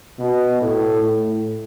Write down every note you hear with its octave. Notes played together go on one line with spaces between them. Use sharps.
B2
A2
A2